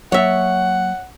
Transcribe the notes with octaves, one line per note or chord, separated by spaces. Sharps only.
F#3 A#3 C#5 E5 F#5